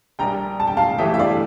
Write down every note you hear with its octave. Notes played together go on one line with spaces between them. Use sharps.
A#1 A#2 G3 D4 G5 A#5
A5
G5
F5 A5
G2 E3 A3 E4 G4 E5 G5
E5
D5 F5